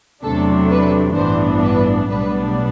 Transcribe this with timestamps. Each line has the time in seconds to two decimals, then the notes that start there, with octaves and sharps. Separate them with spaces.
0.24 E2 C3 F#3 A3 D4 A4
0.71 B4
1.17 A1 G2 E3 B3 D4 C5
1.64 B4
2.10 B1 A2 G3 B3 D4 B4